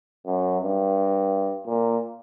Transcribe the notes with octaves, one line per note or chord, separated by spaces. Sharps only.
F#2
G2
A#2